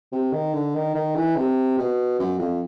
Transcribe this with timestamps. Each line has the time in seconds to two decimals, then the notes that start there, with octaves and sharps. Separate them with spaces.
0.12 C3
0.33 D#3
0.54 D3
0.75 D#3
0.94 D#3
1.15 E3
1.36 C3
1.78 B2
2.19 F#2
2.39 F2